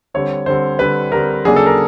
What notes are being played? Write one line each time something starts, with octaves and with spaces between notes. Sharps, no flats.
D3 G3 C4 C#5
D3 G3 C4 C5
D3 G3 C4 B4
D3 G3 C4 A#4
C#3 F#3 A#3 D4 G#4
A4
A#4